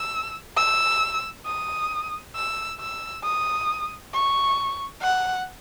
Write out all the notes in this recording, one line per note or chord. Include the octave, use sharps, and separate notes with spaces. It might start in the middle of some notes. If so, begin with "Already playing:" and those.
Already playing: E6
E6
D#6
E6
E6
D#6
C#6
F#5